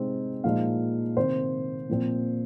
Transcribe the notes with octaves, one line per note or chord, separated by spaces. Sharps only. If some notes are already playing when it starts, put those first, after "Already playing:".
Already playing: C3 G#3 C4 D#4
A#2 F3 G#3 D#4 F5
C3 D#3 C4 C5
A#2 F3 C4